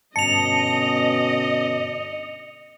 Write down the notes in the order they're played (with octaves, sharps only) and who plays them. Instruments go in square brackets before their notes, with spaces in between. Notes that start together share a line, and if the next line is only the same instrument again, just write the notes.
[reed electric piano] G2 A5 [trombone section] B2 D3 C#4 [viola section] D#5 [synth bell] C#7 F7